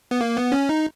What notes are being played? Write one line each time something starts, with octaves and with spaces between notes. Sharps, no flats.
B3
A#3
B3
C#4
D#4